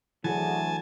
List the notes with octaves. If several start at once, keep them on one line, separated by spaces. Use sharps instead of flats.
D2 E3 F#3 F#4 G#4 G#5 A5